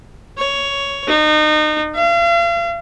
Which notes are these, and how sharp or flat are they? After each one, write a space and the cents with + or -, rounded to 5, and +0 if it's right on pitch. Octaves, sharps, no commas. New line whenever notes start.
C#5 +10
D#4 -30
F5 -40